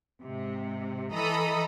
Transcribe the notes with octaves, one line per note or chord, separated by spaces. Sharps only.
G#2 C3
E3 A4 D#5 A#5 B5 D#6